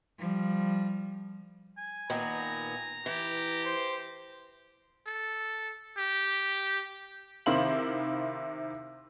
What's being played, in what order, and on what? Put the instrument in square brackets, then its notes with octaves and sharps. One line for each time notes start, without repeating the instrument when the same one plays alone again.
[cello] F3 G3
[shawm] G#5
[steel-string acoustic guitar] A#2 D#3 B3 [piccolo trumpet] A#5
[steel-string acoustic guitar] E3 [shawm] G4
[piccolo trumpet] C5
[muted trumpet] A4
G4
[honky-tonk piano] C3 D#3 E4 C5 F5 F#7